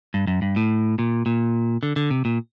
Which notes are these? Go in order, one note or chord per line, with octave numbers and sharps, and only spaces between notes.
G2
F#2
G2
A2
A#2
A#2
D3
D3
C3
A#2